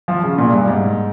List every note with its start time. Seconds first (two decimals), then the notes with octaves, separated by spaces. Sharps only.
0.08 F3
0.23 C#3
0.38 A#2
0.53 G2
0.68 G#2